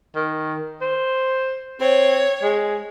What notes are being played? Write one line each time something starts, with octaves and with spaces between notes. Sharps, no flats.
D#3
C5
C4 C#5
G#3